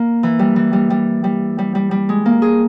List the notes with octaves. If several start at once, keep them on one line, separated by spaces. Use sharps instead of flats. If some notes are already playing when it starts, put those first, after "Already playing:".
Already playing: A#3
E3
G3
E3
G3
G3
G3
G3
G3
G3
G#3
A#3
G#4